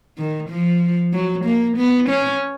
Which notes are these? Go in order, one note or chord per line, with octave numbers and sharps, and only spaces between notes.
D#3
F3
F#3
A#3
B3
C#4